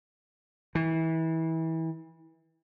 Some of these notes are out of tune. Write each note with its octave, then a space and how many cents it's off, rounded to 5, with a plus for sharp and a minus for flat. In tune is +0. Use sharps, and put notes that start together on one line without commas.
E3 -30